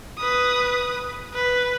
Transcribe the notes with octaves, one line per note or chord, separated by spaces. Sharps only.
B4 D#6
B4